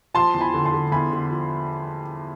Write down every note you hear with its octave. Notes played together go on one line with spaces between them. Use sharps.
F3 A5 C6
E2
G#5 B5
D3
A5 C6
D3
E2 G#5 B5
D3
F3